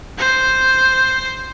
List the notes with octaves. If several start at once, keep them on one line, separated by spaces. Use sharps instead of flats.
C5